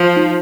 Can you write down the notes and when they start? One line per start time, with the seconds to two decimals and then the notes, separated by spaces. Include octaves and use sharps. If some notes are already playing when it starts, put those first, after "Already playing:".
Already playing: F3
0.16 D#4